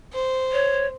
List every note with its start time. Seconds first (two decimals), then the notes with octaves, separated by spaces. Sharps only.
0.13 C5
0.53 C#5